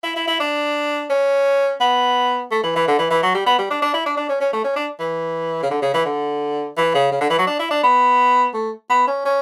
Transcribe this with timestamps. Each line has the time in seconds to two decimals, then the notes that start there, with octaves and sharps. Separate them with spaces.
0.03 E4
0.16 E4
0.27 E4
0.40 D4
1.10 C#4
1.81 B3
2.51 A3
2.63 E3
2.76 E3
2.87 D3
2.98 E3
3.10 E3
3.23 F#3
3.35 G3
3.46 B3
3.58 G3
3.70 D4
3.82 D4
3.93 E4
4.06 D4
4.17 D4
4.29 C#4
4.41 C#4
4.53 A3
4.64 C#4
4.76 D4
4.99 E3
5.63 C#3
5.71 D3
5.82 C#3
5.94 E3
6.06 D3
6.77 E3
6.95 C#3
7.12 C#3
7.21 D3
7.30 E3
7.39 F#3
7.47 D4
7.59 E4
7.71 D4
7.83 B3
8.54 A3
8.90 B3
9.07 C#4
9.25 C#4